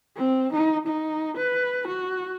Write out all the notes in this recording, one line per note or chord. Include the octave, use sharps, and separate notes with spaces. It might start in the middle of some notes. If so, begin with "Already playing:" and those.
C4
D#4
D#4
B4
F#4